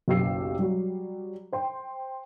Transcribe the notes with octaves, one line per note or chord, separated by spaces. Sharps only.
F#1 B1 G4 E6 C7
F#3 G3
C5 G5 C6